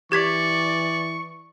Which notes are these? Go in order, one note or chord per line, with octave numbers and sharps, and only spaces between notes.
E3 G4 D5 C#6 G#6 B6